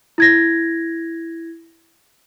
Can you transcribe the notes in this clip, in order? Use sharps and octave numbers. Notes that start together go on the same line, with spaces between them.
E4 G#6 A#6